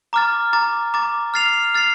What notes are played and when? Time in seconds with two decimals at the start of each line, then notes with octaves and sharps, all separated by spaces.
0.13 A#5 D6 F6 A6
0.53 A#5 D6 A6
0.94 A#5 D6 A6
1.34 F6 A6 C7 F7
1.75 F6 A6 C7 F7